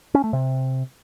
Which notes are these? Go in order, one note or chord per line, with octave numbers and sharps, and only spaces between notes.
C#4
A3
C3